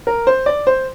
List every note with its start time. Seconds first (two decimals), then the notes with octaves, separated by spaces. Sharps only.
0.07 A#4
0.27 C5
0.46 D5
0.67 C5